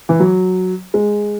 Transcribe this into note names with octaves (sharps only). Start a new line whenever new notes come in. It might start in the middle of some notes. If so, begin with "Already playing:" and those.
E3
F#3
G#3